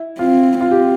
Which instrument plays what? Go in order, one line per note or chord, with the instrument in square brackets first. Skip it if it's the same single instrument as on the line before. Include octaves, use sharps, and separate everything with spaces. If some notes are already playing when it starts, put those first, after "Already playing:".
Already playing: [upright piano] E4
[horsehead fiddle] C4 [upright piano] F4
[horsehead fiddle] C4 [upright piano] F4
[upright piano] G4